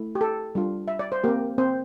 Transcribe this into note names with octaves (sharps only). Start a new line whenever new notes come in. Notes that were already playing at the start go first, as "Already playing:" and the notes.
Already playing: A3 E4
G4
A4
G3 D4 F4
E5
D5
C5
A#3 C4 G4 A#4
C4 C5